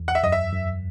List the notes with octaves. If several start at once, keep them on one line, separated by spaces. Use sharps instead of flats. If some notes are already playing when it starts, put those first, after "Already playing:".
Already playing: E2
F#5
E5
F#2 D#5
E5
F#2